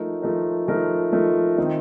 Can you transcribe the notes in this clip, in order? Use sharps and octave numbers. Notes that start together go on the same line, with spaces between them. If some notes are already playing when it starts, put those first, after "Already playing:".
Already playing: F3 A3 D#4 A#4
F3 A3 D#4 A#4
F3 A3 D#4 A#4
F3 A3 D#4 A#4
D#3 A3 C4 D#4